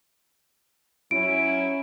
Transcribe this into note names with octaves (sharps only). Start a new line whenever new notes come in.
F#3 C#4 E4 D7